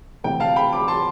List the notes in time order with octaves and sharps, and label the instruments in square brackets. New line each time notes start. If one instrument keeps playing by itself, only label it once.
[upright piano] D2 C3 E3 G5
F5 A5
G5 B5
B5 D6
A5 C6